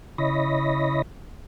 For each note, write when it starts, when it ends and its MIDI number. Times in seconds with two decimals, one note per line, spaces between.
0.18 1.02 49
0.18 1.02 64
0.18 1.02 73
0.18 1.02 75
0.18 1.02 83
0.18 1.02 94